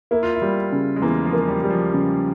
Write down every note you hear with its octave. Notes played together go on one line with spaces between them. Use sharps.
A#3 E4
F4
E4
G3
C#3
G#3
E2 A#3
F3
A#3
G3
G3
F3
C#3